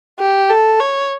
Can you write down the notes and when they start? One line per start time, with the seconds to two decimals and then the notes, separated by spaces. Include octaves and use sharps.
0.20 G4
0.50 A4
0.80 C#5